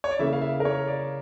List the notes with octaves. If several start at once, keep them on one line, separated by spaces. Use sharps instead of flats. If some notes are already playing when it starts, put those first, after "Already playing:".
C#5
D5
C#3 E3 A#3 E5
F5
E5
A#4
C#5
D5